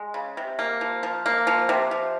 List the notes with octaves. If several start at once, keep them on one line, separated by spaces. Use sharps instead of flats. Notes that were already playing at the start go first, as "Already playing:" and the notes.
Already playing: G#3
C#3
C3
A#3
F3
F3
A#3
F3
C3
F3